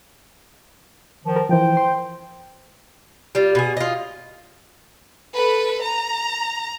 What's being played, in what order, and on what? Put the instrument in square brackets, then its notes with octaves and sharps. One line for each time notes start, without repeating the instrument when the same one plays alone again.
[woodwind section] D#3 F3
[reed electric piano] A#4
[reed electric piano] E3 F3 [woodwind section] C5 G5
[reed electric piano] C6
[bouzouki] G3 F4
B2 G#4
F4 D#5
[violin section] A4 B4
A#5